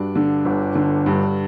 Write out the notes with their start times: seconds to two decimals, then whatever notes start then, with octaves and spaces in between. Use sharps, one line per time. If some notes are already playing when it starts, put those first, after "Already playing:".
Already playing: G2 D4 F#4
0.15 D3
0.45 G1
0.75 D3
1.06 G2